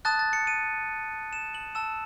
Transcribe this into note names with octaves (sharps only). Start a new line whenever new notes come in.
A5 D#6 F#6 A6
A6
C#7
D#7
E7
F#7
A5 E6 E7